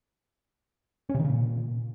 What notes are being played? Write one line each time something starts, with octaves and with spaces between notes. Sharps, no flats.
C#4
C3
D#3
C#3
A#2